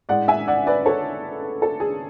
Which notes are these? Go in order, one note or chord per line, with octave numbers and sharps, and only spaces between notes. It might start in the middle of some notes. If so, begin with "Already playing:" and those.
A2 G#3 D5 F#5
E5 G#5
D5 F#5
B4 D5
A4 C#5
A4
G#4